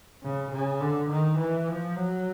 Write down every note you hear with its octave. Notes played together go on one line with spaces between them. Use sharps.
C#3
C#3
D3
D#3
E3
F3
F#3